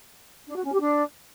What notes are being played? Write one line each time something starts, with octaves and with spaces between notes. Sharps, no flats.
D4
F#4
C#4
G4
D4